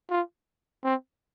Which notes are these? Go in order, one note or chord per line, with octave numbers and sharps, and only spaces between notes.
F4
C4